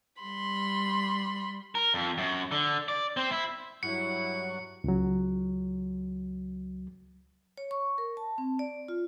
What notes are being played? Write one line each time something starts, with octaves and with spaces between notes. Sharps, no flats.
G3 B5 C6
A#4
F2
F#2
D3
D5
C4
E4
G2 F#3 E4 F#5 C#6 C#7
C#2 F#3
C#5
C#6
A#4
A5
C4
D5
F4